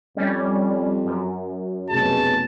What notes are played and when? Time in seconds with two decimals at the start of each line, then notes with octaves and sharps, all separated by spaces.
0.17 F2 G3 C#4
1.05 F#2
1.90 F1 B2 C#4 G#4 A5